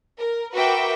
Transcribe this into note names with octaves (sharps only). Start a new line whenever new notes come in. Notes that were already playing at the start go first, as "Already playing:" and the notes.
A#4
F#4 A#4 B4 E5 G5 D6